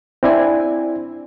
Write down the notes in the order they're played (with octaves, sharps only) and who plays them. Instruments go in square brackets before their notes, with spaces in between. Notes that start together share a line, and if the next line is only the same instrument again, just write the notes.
[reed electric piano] C4 D4 E4 D5 G#5